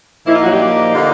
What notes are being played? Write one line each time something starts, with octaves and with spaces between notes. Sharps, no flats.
A#2 F3 A#3 D#4 E4
F4
F#3 F#4
G3 G4
D3 G3 A#3 D#4